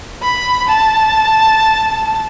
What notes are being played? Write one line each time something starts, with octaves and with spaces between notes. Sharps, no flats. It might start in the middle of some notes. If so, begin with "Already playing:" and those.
B5
A5